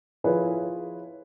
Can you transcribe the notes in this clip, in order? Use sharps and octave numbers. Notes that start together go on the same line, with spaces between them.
F3 E4 F4 G#4 B4 C#5